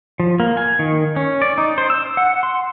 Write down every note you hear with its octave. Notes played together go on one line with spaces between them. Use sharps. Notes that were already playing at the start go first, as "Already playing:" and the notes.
F3
A#3
G#5
D#3
C#4
D5
D#4
C5
E6
F#5
C6